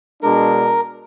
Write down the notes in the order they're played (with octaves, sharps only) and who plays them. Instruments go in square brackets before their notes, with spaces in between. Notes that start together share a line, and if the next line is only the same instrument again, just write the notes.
[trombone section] B2 G#3 D4 [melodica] A#4